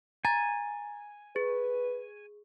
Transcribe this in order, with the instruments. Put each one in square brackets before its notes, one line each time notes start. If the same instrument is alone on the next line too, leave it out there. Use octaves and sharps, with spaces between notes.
[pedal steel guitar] G#5 [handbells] A#5 A6
[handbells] G#4 [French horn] B4